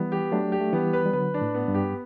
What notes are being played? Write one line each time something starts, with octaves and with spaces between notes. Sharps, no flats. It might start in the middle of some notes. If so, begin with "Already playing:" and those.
Already playing: E3 G3 B3
G4
F#3 A3 D4
G4
A3
E3 G3 B3
B4
G3
D3 F#3 B4
D4
A2
B3
G2
G4